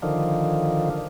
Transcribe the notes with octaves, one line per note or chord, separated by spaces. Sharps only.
D3 D#3 F3